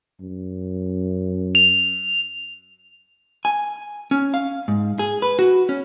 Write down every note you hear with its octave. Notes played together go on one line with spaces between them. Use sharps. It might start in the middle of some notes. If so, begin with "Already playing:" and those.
F#2
F7
G#5
C#4
F5
G#2
G#4
B4
F#4
C#4